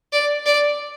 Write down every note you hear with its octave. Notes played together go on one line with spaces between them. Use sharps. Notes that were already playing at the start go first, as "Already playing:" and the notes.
D5
D5